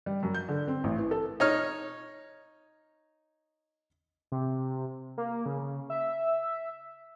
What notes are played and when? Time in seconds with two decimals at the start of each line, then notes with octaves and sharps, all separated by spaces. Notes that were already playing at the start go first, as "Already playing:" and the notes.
0.06 G3
0.23 F#2
0.34 G6
0.48 D3
0.68 C4
0.84 A1
0.98 E3
1.11 A4
1.40 D#4 C#5 F6
4.32 C3
5.18 A#3
5.46 C#3
5.90 E5